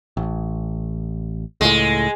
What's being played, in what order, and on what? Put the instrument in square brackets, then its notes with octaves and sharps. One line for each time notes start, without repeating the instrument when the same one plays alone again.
[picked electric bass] A1
[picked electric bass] C#2 A2 [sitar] G#3